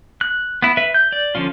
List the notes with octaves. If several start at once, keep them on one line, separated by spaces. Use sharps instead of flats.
F#6
B3 E4
B4 E5
G6
D5
D3 F3 C#4 F4